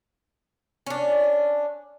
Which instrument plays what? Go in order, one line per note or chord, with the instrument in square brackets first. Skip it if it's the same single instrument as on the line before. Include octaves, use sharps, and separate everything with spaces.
[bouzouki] C#4 D4